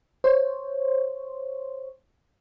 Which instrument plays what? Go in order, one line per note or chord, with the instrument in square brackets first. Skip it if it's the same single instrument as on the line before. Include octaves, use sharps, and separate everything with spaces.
[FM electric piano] C5 C#5